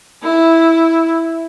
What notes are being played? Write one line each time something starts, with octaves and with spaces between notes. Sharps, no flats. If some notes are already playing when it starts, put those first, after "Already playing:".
E4